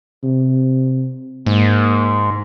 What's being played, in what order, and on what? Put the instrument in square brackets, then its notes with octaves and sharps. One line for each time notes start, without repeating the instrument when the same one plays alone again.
[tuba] C3
[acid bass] G#2 [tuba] A#3